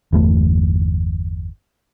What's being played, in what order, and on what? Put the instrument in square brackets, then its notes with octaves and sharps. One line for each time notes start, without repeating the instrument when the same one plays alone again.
[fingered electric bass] G1 E2 A3